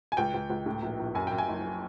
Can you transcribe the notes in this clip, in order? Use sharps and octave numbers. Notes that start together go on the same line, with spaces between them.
G#5
C#2 G5
C#2
C#2
A2
A#1
A#1
F#2 G#5
F#2 G5
G#5
F#1